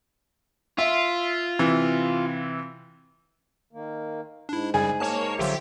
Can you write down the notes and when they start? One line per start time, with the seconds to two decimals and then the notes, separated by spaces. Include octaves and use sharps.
0.79 F4 E5
1.59 C3 E3
3.73 D#3 A#3
4.49 G#2 D4 E4
4.74 F#2 C#3 G3 G#4
5.00 A#3 C#5 A5
5.39 A#1 D3 F#3 F4 G4 C5 E5